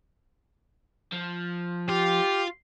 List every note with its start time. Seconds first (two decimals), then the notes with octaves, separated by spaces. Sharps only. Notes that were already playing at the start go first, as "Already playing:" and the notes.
1.12 F3
1.89 F4 G4